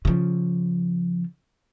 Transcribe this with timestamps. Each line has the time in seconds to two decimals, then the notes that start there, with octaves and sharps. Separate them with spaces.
0.05 C#3 F3